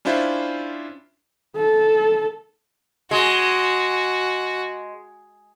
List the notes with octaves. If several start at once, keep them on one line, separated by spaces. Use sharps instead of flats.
C#4 D4 E4 F4 C5 E5
A4
G#3 F#4